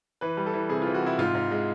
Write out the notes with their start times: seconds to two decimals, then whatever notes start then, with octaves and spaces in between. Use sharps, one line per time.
0.21 E3 B4
0.37 G3
0.46 A4
0.53 E3
0.69 C3 G#4
0.82 F4
0.87 E3
0.94 F#4
1.02 C3 E4
1.18 G#2 F4
1.35 G#2
1.51 G#3